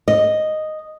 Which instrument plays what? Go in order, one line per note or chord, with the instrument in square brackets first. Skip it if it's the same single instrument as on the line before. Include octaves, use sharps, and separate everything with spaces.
[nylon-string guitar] D#5